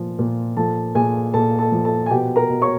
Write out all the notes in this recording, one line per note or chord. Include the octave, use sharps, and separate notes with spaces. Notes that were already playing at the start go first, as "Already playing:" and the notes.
Already playing: A#2 F3
A#2
F3 A4 A5
A#2 G#4 G#5
A#2 A4 A5
A4 A5
F3
A4 A5
G#5
B2 G4 G5
A#4 A#5
B2
C#5 C#6